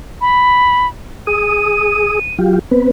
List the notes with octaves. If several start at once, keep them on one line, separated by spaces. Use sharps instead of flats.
B5
G#4 D#6 D#7
F#3 F4 G4
B3 C4 B4